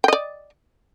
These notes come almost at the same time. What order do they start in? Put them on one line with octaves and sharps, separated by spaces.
G5 D#5 D5